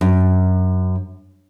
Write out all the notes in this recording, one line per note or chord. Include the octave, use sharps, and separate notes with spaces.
F#2